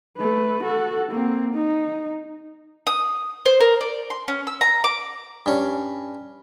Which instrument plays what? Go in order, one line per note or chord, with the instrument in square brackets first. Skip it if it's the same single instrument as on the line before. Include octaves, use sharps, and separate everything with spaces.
[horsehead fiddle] A3 B4
F#4 A4
A#3 C4
D#4
[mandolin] D#6
C5
A#4
D5
C6
C#4
E6
A#5
D6
[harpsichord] G2 C#4